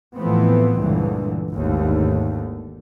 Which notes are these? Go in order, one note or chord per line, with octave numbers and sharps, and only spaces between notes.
A2 E3 F3 A3 B3 C4
C#2 G2 A#2 D3 E3
G#1 D#2 D3 A3